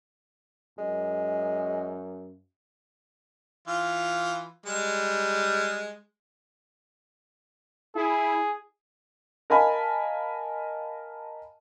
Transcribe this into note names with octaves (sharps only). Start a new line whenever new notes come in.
F#2 G#3
E3 F4
G3 G#3
E4 G#4
A#4 D#5 F5 G#5 A5 B5